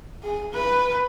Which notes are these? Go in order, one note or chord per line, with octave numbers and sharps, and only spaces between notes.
G#4
B4